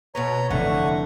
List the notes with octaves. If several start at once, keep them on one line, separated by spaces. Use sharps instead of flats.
B2 A4 B4 C#5 A#5
F1 D3 E3 A3 F#5 C#6